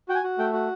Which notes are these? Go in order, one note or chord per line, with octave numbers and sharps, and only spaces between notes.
F#4 G5
G#5
F#4
A3 G5
F#4